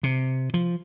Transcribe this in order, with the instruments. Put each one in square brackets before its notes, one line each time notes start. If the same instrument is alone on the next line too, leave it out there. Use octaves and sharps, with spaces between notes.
[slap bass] C3
F3